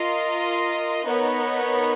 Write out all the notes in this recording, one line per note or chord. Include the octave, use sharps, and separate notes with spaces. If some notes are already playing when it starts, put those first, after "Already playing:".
Already playing: F4 A#4 D#5
B3 D#4 A#4 C#5